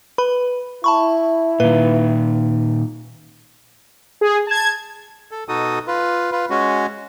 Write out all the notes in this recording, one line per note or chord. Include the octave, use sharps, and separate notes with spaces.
B4 B5
E4 A5 B5 C#6
A#2 D#3 B4
G#4
A5 G#6
A4
B2 D#4 F#4 A4 D#6
F4 B4
F4 B4
G#3 C#4 F#4